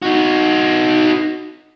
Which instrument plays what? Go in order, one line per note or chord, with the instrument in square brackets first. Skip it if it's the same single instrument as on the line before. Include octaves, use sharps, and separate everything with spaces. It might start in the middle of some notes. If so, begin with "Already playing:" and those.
[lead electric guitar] D#4 F#4